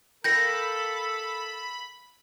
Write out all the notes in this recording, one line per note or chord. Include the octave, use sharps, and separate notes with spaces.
A4 A#4 F5 G5 B5 G6 A#6 C#7